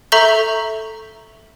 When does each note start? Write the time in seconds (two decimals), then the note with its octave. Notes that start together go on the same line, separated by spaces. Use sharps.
0.12 A4 E5 A#5 C#6 G6 G7